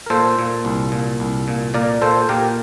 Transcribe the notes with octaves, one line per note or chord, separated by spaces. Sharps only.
A#4
A#2 A4 C5
A#2
C2
A#2
C2
A#2
A#2 A#4 D5
A#2 A4 C5
A#2 G4 A#4